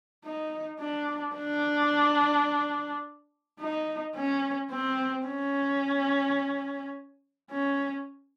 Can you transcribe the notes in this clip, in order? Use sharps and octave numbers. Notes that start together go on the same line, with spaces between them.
D#4
D4
D4
D#4
C#4
C4
C#4
C#4